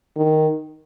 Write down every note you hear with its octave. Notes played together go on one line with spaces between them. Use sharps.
D#3